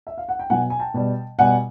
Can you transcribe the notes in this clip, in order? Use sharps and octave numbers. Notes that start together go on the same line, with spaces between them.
E5
F5
F#5
G5
B2 F#3 F#5 G#5
G#5
G5 A5
B2 G3
B2 G3 F#5 G#5